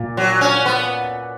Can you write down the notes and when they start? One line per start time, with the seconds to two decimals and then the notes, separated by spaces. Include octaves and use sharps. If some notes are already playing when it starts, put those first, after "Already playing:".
Already playing: A#2
0.17 F#3
0.41 C#4
0.66 B3